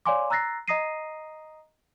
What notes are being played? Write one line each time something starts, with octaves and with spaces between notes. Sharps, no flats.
C#5 D5 F5 G#5 C6 D6
A#5 E6 F#6 A6 A#6 C7
D#5 A#5 D#6 A#6 C7 D#7